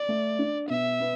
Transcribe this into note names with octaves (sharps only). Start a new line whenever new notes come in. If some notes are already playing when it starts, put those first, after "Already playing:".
Already playing: D5
A3
D4
B2 E5
B3